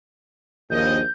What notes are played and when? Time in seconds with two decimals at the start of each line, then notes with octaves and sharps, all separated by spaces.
0.70 A#1 D#2 D#5 G6